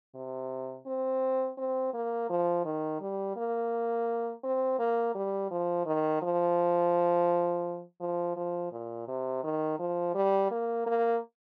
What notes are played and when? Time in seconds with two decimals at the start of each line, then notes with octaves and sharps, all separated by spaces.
0.15 C3
0.86 C4
1.58 C4
1.94 A#3
2.29 F3
2.65 D#3
3.00 G3
3.36 A#3
4.44 C4
4.79 A#3
5.15 G3
5.51 F3
5.86 D#3
6.22 F3
8.00 F3
8.36 F3
8.72 A#2
9.08 C3
9.44 D#3
9.79 F3
10.15 G3
10.51 A#3
10.86 A#3